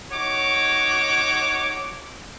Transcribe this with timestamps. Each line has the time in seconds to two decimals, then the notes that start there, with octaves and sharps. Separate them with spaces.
0.12 D#4 F#4 C#5 D6